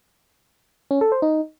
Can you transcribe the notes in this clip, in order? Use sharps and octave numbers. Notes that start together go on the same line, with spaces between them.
C#4
A4
C5
D#4